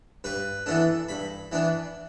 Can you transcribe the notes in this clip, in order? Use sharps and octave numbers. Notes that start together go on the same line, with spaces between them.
G2 B4
E3 B3 D4 A4
G2 B5
E3 B3 D4